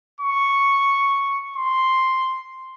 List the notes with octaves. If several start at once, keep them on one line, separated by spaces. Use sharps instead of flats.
C#6
C6